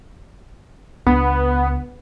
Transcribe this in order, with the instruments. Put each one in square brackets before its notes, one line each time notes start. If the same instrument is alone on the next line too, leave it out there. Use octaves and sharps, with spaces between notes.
[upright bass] C#2 D4 [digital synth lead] B3